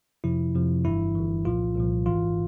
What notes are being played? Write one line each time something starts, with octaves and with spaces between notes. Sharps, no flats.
F2 C3 F3 E4
F2 C3 F3
G1 G2 E3 E4
G1 G2 E3
C2 A#2 F3 F4
C2 A#2 F3
G#1 G#2 E3 F4